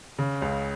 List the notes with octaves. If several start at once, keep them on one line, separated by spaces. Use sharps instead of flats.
C#3
C#2